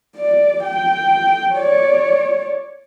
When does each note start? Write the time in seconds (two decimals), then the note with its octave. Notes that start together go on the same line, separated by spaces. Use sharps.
0.16 D5
0.63 G5
1.53 C#5 D5